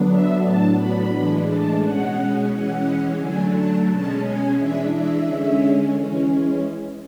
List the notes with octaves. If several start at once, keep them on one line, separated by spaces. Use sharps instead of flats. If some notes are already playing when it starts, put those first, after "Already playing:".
Already playing: D3 F#3 B3 D4
E5
A2 F#3 B3 D4 A5
B5
A2 E3 G#3 D4
A5
B2 G#3 C#4 F#5
E3 G#3 C#4 F#5
D3 F#3 A3 D4 G#5
A5
B2 G#3 C#4 A5
G#5
E3 G#3 D4 E5
E5
D3 G#3 C#4
E3 G#3 C#4